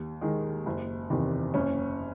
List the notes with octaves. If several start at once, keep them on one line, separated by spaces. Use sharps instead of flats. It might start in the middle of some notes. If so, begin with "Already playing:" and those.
Already playing: D#2
D#3 G#3
F#1
E2 C3 D#3
F#1 C#4